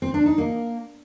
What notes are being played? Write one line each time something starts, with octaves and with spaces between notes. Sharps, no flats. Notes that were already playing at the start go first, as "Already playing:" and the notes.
C4
D4
D#4
A#3